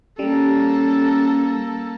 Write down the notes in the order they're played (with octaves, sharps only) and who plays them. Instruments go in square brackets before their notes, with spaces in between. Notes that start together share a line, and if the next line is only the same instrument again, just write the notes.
[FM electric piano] G3 [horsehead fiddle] A#3 A4 [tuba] C#4